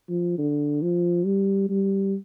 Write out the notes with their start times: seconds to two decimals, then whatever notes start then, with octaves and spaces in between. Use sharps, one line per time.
0.09 F3
0.38 D3
0.82 F3
1.26 G3
1.69 G3